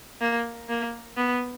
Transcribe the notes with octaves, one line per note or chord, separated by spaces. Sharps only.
A#3
A#3
B3